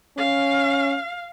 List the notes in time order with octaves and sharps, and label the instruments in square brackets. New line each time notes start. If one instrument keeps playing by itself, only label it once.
[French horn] C#4 [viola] F5